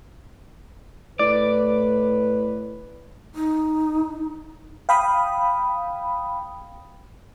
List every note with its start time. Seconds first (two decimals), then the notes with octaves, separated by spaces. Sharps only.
1.19 A2 B4 D5
3.35 D#4
4.89 F5 G5 B5 D#6